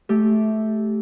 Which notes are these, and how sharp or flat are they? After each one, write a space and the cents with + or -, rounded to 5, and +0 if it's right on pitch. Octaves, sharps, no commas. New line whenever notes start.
A3 -15 G4 -5